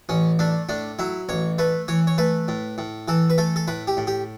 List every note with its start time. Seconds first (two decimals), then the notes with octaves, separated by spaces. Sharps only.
0.09 A1 C#4
0.39 A3 D4
0.69 A2 D4
0.99 F#3 E4
1.29 A1 C#5
1.58 A3 B4
1.88 E3 C#5
2.07 C#5
2.18 A3 B4
2.48 A2
2.78 A2
3.08 E3 A4
3.30 B4
3.38 A3 A4
3.56 A4
3.68 A2 B4
3.88 G4
3.97 A2
4.07 G4